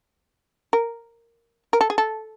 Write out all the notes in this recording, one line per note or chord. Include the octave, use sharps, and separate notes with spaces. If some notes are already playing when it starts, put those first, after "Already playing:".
A#4
A#4
A4
G#4
A4